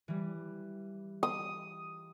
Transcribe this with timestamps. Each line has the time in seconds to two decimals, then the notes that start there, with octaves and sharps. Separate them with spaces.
0.08 E3 G3
1.23 D#6